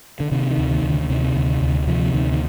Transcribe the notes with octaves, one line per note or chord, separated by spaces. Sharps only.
D3
C3 D#3
D#3
D2
D#3
D2
D3
D3
C3 D#3
D2
D2
C3 F3
D2 D#3
D#3